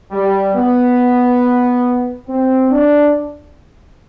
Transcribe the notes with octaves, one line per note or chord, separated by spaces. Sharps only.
G3
B3
C4
D4